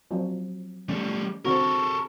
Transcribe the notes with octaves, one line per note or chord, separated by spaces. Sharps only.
F3 F#3 C4
G3 A3 C#4
D3 C4 F#4 A4 A#4 C#6